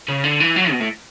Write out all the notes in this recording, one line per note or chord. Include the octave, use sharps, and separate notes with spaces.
C#3
D3
E3
F#3
B2
A2